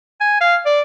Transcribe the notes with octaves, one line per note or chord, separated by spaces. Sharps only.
G#5
F5
D5